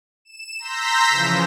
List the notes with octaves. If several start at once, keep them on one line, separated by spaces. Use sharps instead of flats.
E7
A#5 C6 E6 G6 A#6 B6
C#3 E3 F3